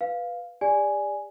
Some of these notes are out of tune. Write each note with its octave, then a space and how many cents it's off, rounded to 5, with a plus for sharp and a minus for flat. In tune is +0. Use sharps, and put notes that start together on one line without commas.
B4 +0 F5 +0
G4 +45 D5 +0 G#5 +0